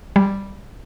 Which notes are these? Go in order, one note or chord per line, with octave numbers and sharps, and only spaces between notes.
G3